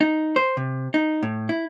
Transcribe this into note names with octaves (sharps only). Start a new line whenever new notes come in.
D#4
C5
C3
D#4
A2
E4